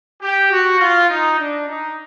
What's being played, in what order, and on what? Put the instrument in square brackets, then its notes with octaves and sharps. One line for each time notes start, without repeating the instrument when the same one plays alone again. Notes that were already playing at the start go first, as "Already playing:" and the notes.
[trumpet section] G4
F#4
F4
D#4
D4
D#4